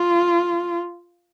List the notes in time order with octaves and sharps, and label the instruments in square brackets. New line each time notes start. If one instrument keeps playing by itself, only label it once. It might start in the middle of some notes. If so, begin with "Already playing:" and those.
Already playing: [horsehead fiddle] F4